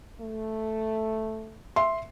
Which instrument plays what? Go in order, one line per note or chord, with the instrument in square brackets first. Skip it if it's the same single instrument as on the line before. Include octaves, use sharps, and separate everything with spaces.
[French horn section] A3
[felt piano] E5 C6